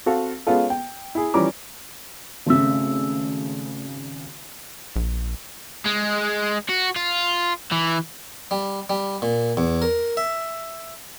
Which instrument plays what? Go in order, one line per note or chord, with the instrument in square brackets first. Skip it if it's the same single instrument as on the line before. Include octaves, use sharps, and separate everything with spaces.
[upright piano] C4 F#4 A4 F5
G#3 B3 C#4 F4 A4
G5
E4 G#4
E3 F3 G3 C#4 A#5 D6
[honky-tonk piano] G#1 C#3 [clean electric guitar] A3 C4 E5
[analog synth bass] A#1
[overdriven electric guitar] G#3
F#4
F4
E3
[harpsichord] G3
G3
A#2
E2
A#4
E5